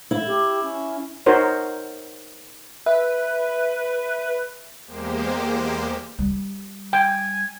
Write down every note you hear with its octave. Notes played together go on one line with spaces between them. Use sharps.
E4
G4
C#4
D#4 F#4 A#4 C5 C#5
B4 E5
E2 G#3 A#3 G4 C5
G3
G5 G#5